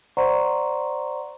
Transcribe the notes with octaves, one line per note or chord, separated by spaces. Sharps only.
C5 D5 F#5 A#5 C6 C#6